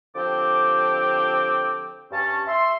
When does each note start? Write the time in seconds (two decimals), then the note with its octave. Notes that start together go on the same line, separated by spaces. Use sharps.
0.15 D3 F3 C4 G4 G5 D6
2.11 G2 C#4 A5
2.46 E5 C6